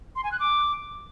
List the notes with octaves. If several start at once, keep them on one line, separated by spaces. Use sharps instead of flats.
C6
G#5
F#6
D6